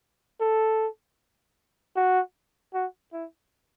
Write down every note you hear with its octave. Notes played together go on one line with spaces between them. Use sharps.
A4
F#4
F#4
E4